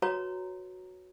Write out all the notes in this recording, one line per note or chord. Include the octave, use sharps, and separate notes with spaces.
F#4 B4 C#5 A#5